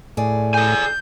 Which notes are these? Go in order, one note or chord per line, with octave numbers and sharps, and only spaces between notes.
A2 G#4 D5
A4 G#5 G6